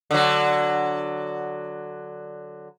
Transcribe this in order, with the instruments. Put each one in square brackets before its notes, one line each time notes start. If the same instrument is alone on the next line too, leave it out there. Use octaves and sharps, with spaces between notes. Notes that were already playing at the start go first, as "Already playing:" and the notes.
[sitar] D3 F#3